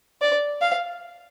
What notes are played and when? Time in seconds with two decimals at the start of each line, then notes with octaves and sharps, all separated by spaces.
0.22 D5
0.61 F5